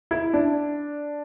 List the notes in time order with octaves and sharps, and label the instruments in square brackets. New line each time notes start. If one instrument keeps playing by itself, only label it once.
[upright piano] E4
D4